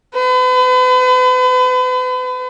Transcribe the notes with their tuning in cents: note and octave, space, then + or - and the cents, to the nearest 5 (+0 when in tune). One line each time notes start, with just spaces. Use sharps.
B4 +40